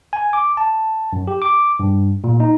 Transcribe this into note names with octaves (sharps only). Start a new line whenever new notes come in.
G#5
D6
A5
F#2
G4
D6
G2
A#2
D#4